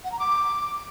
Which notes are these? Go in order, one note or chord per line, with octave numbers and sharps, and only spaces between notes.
F#5
A#5
D6